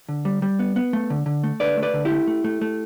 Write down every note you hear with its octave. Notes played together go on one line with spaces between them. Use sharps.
D3
G3
G3
B3
B3
A3
D3
D3
A3
D3 B4 D5
A3
B4 D5
D3
E4 G4
A3
A3
A3
A3